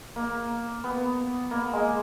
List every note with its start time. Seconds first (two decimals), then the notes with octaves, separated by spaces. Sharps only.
0.16 A#3
0.84 B3
1.51 A#3
1.73 G#3